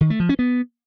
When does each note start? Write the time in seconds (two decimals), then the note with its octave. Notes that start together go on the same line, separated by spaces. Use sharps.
0.01 D#3
0.10 A3
0.20 F3
0.29 C#4
0.39 B3